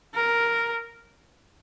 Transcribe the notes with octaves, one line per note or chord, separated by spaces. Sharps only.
A#4